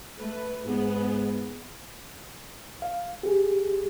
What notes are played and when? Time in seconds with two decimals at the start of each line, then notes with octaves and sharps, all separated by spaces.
0.18 A3 B4
0.65 G#2 B3 G#4
2.82 F5
3.23 G4 G#4